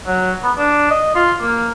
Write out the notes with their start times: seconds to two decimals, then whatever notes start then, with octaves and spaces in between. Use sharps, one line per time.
0.07 F#3
0.43 B3
0.58 D4
0.91 D#5
1.15 F4
1.41 A#3